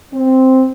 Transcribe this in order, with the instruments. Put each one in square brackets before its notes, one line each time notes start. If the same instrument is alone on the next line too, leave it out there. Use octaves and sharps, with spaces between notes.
[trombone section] C4